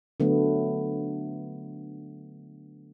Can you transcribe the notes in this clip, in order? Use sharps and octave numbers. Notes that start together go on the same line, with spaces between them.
D3 F#3 A3 B3